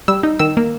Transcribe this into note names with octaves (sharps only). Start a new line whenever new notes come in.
G3 E6
D#4
D#3 E6
A#3